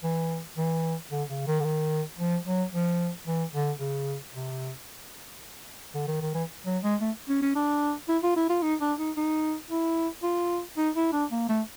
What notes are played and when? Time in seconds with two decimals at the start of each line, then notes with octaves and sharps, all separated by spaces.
0.03 E3
0.57 E3
1.11 D3
1.30 C#3
1.47 D#3
1.60 D3
1.64 D#3
2.19 F3
2.45 F#3
2.72 F3
3.25 E3
3.53 D3
3.79 C#3
4.34 C3
5.94 D3
6.08 D#3
6.21 D#3
6.34 E3
6.66 F#3
6.83 G#3
7.01 A3
7.29 C#4
7.42 C#4
7.55 D4
8.08 E4
8.23 F4
8.36 E4
8.49 F4
8.62 D#4
8.81 D4
8.98 D#4
9.17 D#4
9.70 E4
10.23 F4
10.77 D#4
10.96 E4
11.13 D4
11.31 A#3
11.49 A3